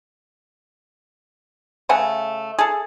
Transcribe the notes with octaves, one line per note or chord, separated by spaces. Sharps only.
C#3 A3 F#5 G#5
G#4 A4